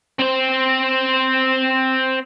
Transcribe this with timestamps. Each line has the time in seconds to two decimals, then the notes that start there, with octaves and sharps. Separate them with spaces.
0.19 C4 C5